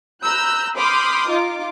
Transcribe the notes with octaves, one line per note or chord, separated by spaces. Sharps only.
A#5 B5 E6 F#6 G6
B5 C6 D6 D#6 F6 G6
D#4 F4 D6